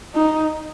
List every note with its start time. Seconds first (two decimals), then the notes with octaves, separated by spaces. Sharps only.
0.14 D#4